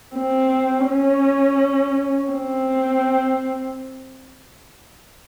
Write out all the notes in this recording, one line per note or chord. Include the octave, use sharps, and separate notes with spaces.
C4
C#4
C4